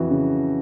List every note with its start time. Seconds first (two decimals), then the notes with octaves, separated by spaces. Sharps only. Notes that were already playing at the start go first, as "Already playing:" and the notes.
Already playing: F2 E3 F#4
0.10 C#3